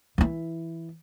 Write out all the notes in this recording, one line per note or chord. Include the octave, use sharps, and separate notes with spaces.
E3 E4